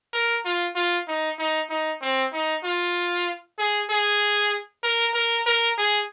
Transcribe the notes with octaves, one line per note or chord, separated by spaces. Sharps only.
A#4
F4
F4
D#4
D#4
D#4
C4
D#4
F4
G#4
G#4
A#4
A#4
A#4
G#4